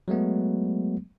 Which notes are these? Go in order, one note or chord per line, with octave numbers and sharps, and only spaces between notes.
F#3 G#3 A3 B3